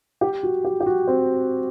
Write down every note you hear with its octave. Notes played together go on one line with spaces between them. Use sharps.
G4
F#4
G4
G4
F#4
C4